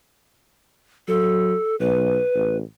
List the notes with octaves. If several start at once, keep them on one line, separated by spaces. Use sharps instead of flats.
F#3 A4
B1 B4
A1